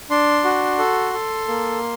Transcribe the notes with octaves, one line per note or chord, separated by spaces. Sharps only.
D4 C6
F#4
A4
A4
A#3